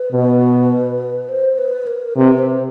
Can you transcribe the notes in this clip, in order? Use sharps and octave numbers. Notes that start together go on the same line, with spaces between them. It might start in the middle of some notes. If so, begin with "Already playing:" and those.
Already playing: B4
B2
C5
B4
A#4
C3 B4
C5